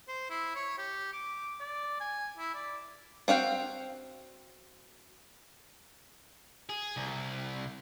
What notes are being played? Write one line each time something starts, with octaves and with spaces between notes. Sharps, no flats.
C5
E4
C#5
G4
D6
D5
G#5
E4
D5
C4 F#4 F5 G5
G#4
C2